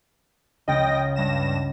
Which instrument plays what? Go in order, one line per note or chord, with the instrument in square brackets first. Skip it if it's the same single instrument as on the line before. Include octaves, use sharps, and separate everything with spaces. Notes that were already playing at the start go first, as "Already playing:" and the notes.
[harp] C#2 [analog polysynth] D#5 G5 A#6
[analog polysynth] G2 A#6 E7